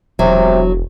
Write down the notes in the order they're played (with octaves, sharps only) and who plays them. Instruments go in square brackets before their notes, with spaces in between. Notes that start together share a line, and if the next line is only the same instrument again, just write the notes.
[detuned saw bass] E1 [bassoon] C3 [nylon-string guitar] F#3